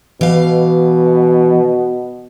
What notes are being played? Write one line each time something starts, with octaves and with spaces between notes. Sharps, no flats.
B2 E3 F5